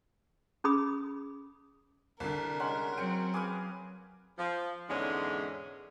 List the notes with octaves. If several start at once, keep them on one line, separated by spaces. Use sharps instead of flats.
C#4 G#4 B5 D#6
C2 D3 A#4
G#3 C#4 F#5
F#3 C4 G5 C#7 D7
G#4 B4 F5 G#5 D6
F3
E2 G#2 D3 G#3 C#4 D4